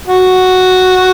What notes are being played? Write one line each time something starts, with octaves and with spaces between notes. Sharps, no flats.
F#4